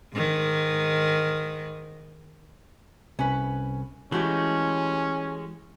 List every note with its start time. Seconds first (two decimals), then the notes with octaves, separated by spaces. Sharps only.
0.13 G#2 D#3
3.19 C2 C#4 B4
4.12 E3 G#3 A3 C#4 F#4 G4